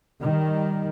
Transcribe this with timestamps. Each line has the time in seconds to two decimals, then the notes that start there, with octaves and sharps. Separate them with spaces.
0.21 D#3 G3